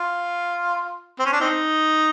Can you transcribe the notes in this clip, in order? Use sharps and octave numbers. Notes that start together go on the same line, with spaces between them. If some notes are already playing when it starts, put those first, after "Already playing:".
Already playing: F4
C4
C#4
D4
C4 D#4